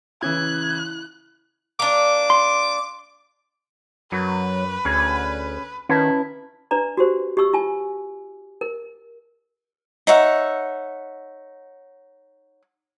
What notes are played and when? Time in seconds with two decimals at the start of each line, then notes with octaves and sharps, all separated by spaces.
0.23 C#3 E3 E4 F#6 G#6
1.80 A#3 D4 D6
2.30 C6
4.12 F#2 F#3 B4
4.85 D2 C#4 G#4
5.89 D#3 C#4 E4 B4 A5
6.71 D4 B4 D5 A#5
6.97 F#4 G4 C5
7.37 G4 D#5 C#6 E6
7.53 F4 G#5
8.61 A#4
10.07 D#4 C#5 E5 F#5